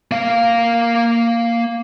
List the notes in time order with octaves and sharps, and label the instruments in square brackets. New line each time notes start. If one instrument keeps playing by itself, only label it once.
[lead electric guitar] A#3 F5